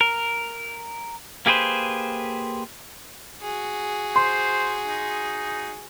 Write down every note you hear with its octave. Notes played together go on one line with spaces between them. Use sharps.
A#4
A#3 G4 G#4 B4 C5
F#4 G#4
C5 C6
D#4